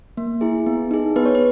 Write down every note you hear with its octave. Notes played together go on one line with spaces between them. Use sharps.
A#3
E4 G#4
B3
D#4 G#4
B3 B4
C#5
B4